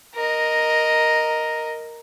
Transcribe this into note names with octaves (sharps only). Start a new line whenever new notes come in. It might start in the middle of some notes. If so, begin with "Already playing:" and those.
A#4 D#5